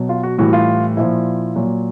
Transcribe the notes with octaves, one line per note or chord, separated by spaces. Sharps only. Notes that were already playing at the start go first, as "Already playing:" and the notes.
Already playing: B2 F#3
F4
F#4
A2 E3 G3 F#4
F4
A#2 F3 E4
A#2 F#3